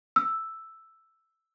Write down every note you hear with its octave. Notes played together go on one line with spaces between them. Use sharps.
E6